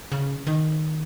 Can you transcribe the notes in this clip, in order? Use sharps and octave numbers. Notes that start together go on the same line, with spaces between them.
C#3
D#3